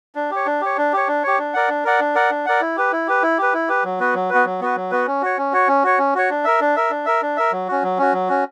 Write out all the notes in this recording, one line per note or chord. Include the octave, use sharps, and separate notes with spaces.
D4
G4 C#5
D4
G4 C#5
D4
G4 C#5
D4
G4 C#5
D4
A#4 D5 F#5
D4
A#4 D5 F#5
D4
A#4 D5 F#5
D4
A#4 D5 F#5
E4
G4 B4
E4
G4 B4
E4
G4 B4
E4
G4 B4
F#3
B3 F#4 B4
F#3
B3 F#4 B4
F#3
B3 F#4 B4
F#3
B3 F#4 B4
C#4
F#4 C#5
C#4
F#4 C#5
C#4
F#4 C#5
C#4
F#4 C#5
D4
A#4 E5
D4
A#4 E5
D4
A#4 E5
D4
A#4 E5
F#3
C#4 F#4
F#3
C#4 F#4
F#3
C#4 F#4